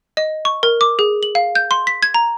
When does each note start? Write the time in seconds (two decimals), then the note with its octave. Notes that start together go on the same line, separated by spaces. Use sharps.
0.17 D#5
0.45 C#6
0.63 A#4
0.81 D6
0.99 G#4
1.23 F#7
1.35 F5
1.55 G6
1.71 C6
1.87 B6
2.03 G#6
2.14 A#5